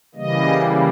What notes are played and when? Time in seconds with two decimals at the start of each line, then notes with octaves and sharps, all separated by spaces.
0.15 C#3 E3 G3 A#3 D#5